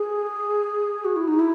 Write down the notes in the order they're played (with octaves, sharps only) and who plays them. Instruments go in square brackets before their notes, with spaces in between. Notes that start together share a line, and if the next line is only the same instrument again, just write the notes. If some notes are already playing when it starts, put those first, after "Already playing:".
Already playing: [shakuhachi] G#4
F#4
E4
D#4
E4